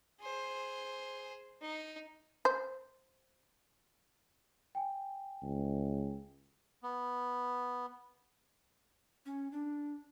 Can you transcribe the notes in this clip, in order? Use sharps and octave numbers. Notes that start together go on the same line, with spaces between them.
G#4 C5
D#4
C5
G5 G#5
C#2
B3
C#4
D4